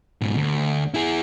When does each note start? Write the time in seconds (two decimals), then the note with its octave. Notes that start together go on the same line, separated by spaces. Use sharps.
0.22 G#2 B2
0.36 D2
0.94 E4 G#4